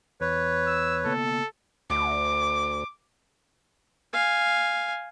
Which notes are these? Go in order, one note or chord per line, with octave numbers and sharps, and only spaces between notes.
E2 B4 C#5
E6
C#3 A#3 B3 A4
D2 D6
F5 G#5